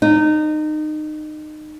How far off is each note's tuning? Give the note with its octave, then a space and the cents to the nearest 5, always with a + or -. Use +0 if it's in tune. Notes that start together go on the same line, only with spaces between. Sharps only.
D#4 -25